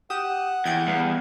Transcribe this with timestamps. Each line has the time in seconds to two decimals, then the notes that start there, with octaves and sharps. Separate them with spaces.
0.10 G4 F#5 D#6 E7
0.65 E2 G5 G6 G#6
0.87 E2 G3 B3 F5